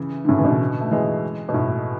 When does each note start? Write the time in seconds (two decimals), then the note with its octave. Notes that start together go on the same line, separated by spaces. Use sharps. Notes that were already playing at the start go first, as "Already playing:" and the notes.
Already playing: C#3 E3
0.25 D3
0.29 A2 C#3
0.39 E3
0.44 B2 D3
0.80 A3
0.91 E3 G#3
1.49 B2
1.54 A2